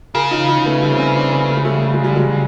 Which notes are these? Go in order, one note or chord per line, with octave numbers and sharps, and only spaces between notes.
C#3 G#4 A#4
D#4 F4
D#4 F4
A3 B3
G3 A3
C4
B3 C#4
C4 D4
B3 C#4
A3
G#3
G3 A3
A3
G#3
G3
F#3 G#3